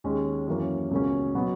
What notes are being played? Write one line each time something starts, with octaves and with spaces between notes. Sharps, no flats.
D#2 D#3 G#3 C#4
F#2 E3 A#3 C#4
C#2 B2 A#3 C#4
B2 F#3 B3 F#4